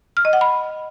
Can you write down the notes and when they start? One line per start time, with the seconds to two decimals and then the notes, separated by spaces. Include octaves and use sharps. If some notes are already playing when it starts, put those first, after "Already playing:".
0.17 F6
0.25 D#5
0.33 F#5
0.41 B5